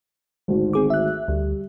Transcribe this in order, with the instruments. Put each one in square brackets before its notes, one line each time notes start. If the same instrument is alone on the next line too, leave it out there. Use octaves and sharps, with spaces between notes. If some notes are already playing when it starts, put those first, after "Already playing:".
[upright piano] G#1 D2 D#3
[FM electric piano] C4 G#4 D6
E5 F#6
[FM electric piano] D2 [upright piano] G3